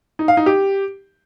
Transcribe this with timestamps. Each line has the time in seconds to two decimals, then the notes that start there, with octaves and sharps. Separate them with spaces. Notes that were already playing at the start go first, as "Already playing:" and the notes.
0.19 D#4
0.28 F5
0.37 D#4
0.46 G4